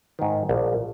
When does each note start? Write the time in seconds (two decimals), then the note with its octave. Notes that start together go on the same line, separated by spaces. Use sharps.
0.19 G#2 D#3
0.49 A#1